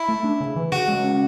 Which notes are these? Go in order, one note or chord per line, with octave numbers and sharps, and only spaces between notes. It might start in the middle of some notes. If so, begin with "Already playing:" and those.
Already playing: E4
A3
D4
C#3
E3
C#3 F#4
G#3
C#4